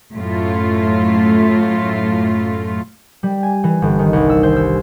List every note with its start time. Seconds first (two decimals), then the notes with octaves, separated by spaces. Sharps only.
0.14 F#2 A2 A3 F4
3.23 G3
3.43 G#5
3.64 E3
3.82 G1
3.99 D#3
4.13 C2
4.30 E6
4.43 C5
4.56 E6